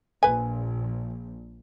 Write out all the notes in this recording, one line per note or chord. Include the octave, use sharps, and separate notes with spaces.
A#1 B4 G#5